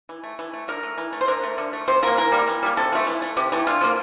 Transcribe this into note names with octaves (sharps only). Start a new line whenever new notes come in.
E3
A3
E3
A3
D3 A#4
A3
E3
A3
C5
D3 A#4
A3
D3
A3
C3 C5
F3 A#3 A#4
E3 A#4
G3 A#3
E3
G3 A#3
C3 A4
F3 A3
E3
A3
C3 G4
E3 A3
D3 F4
F3 A#3